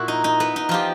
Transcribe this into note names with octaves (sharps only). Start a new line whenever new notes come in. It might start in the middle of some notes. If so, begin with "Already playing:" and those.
Already playing: A#2 E4 F#4
D#4
D#4
B3
D#4
F3 F4 G4